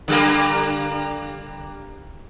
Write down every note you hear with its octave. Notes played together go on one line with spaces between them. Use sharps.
D3 G3 A#3